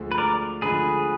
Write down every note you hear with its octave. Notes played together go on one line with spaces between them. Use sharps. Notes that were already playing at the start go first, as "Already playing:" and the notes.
Already playing: D2 D3 F3 G#3
B4
A#4 D5
D3 F3 G#3 G#4 B4